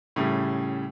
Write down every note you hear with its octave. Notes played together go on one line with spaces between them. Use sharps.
A2 C#3 G3